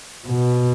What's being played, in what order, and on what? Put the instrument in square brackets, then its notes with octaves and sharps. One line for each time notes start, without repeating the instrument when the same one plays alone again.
[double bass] B2